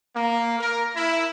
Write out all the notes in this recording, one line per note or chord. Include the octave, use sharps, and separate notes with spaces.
A#3
A#4
E4